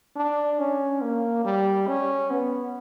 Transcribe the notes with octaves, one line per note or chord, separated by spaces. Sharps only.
D4
C#4
A#3
G3
C#4
B3